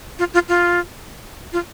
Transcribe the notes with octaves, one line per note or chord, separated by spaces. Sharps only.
F4
F4
F4
F4